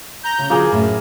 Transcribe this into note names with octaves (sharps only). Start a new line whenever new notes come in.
A#5 G6
C#3
D3 F#3 A#3 F4 G#4
F#2 A2